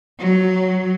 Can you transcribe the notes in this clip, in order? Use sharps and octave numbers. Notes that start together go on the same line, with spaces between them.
F#3